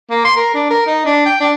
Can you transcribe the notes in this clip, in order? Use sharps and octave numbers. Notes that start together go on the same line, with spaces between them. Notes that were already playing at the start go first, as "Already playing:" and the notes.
A#3
C6
A#4
D4
A#4
D#4
D4
G5
D4